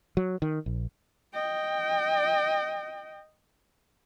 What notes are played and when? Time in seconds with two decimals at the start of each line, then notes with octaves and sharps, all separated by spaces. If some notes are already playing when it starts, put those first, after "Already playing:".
0.17 F#3
0.42 D#3
0.66 A#1
1.34 D#5 G5